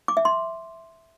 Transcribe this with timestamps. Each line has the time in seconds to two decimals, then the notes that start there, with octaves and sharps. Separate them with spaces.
0.08 D6
0.17 E5
0.25 C6